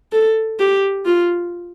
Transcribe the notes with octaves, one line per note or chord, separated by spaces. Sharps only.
A4
G4
F4